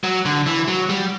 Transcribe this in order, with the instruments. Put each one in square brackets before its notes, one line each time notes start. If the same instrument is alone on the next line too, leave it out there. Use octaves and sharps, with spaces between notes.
[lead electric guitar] F#3
D3
E3
F#3
G3